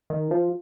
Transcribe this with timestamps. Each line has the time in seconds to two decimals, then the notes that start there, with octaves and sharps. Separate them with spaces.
0.10 D#3
0.31 F3